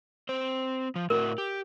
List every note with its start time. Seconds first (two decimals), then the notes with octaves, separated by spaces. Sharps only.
0.29 C4 C5
0.96 F3
1.10 A2 F#4 A#4
1.38 G4